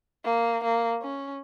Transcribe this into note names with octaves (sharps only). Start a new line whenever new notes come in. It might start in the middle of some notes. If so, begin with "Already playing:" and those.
A#3
A#3
C#4